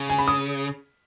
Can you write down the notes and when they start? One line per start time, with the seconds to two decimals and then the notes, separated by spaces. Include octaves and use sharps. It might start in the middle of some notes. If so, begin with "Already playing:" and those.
Already playing: C#3
0.10 G#5
0.18 B5
0.28 D#6